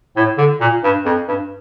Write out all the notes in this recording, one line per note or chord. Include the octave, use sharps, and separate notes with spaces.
A2
D3
A#2
G2
F2
G2